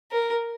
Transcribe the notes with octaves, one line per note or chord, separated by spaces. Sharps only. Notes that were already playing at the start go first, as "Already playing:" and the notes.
A#4